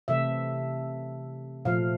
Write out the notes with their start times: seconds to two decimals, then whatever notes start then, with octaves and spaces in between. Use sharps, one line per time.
0.08 C3 E3 A3 E5
1.65 A#2 F3 A3 F5